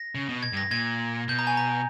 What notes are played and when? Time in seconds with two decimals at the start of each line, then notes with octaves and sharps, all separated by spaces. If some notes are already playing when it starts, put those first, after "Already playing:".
Already playing: A#6
0.15 C#3
0.29 B2
0.43 G#6
0.53 G2
0.57 A#6
0.71 A#2 G#6
1.28 B2 G6
1.39 A#5
1.47 G#5
1.57 A#5